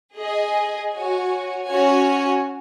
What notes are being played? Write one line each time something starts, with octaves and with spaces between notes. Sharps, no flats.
G#4 D#5 G#5
F#4 C#5 G#5
C#4 F#4 C#5 G#5